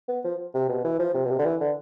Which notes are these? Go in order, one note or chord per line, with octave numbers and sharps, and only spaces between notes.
B3
F3
C3
B2
E3
F3
C3
B2
C3
D3
E3
D3